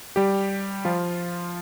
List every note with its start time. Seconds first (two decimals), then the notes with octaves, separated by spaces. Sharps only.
0.16 G3 G4
0.85 F3 F4